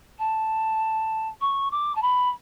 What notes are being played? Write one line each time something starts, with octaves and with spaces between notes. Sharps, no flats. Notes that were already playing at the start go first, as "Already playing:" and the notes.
A5
C#6
D6
A5
B5